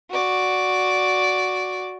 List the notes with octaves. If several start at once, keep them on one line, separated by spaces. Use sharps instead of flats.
F#4 D5